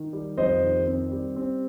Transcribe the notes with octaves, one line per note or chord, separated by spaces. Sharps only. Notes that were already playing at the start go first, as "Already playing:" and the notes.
Already playing: D#3
G3
F2 C5 D#5
D#3
C4
G3
C4